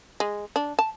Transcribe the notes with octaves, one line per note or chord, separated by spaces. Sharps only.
G#3
D4
A5